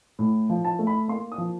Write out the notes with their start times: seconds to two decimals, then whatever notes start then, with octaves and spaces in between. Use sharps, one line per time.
0.19 A2
0.50 F3
0.65 A5
0.79 A3
0.87 B5
1.08 A#3 C6
1.32 D#6
1.38 F3